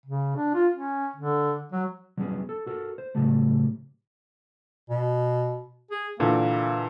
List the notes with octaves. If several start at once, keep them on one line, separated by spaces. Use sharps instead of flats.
C#3
D4
F4
C#4
D3
F#3
F#3 G3 B3 C#4 G#4
A4
F#4 A4 A#4
C5
A2 C#3 E3 F#3 G3 A3
B2
G#4
A#2 D3 E3 A#3